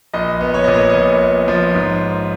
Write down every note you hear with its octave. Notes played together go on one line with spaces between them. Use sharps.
A#1 D#5
B3
C#5
A#2 D#5
C#5
D#5
A#1 C#5
B3
F3
G#2